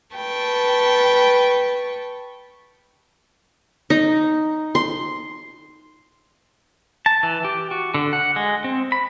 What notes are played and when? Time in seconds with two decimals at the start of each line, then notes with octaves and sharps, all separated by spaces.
0.15 B4 G5 A5 C#6
3.90 D#4
4.75 C6
7.06 A5
7.23 E3
7.45 G4
7.71 F#4
7.94 D3
8.13 F#5
8.36 G#3
8.64 C4
8.92 B5